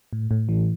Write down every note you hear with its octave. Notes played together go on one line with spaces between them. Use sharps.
A2
A2
E3